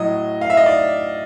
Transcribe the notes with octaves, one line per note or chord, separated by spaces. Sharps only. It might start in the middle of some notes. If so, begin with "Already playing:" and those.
Already playing: A2 F#3 D#5
F5
E5
D#5
D5